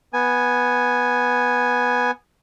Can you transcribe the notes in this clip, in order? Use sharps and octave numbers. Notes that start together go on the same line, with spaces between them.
B3 G#5